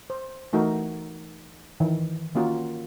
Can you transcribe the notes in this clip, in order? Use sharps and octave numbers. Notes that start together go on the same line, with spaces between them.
C5
E3 A3 D#4 F#4 A#4
D#3 E3
D#3 A#3 C#4 F4 F#4 A#4